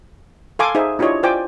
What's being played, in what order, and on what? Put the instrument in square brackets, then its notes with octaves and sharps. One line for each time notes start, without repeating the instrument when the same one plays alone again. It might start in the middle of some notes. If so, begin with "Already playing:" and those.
[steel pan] A4 F5 G#5 C6 D6
D#4 G#4 C5 E5
D4 E4 F4 G4 C#5 D#5
F4 C5 D5 G5 G#5 D6